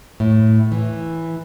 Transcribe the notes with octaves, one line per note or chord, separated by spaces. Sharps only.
A2
E3